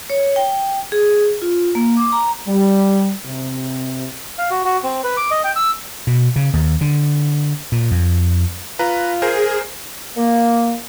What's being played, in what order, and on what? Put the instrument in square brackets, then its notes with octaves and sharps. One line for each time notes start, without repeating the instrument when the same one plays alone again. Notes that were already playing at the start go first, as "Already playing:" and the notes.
[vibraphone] C#5
G5
G#4
F4
A#3
D6
A#5
[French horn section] G3
C3
[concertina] F5
F#4
F#4
C4
B4
D6
D#5
G5
E6
[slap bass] B2
C#3
D#2
D3
A#2
F2
[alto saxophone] F4 [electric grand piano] B4 A#5
[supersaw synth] G#4 [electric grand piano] A#4 C5
[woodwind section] A#3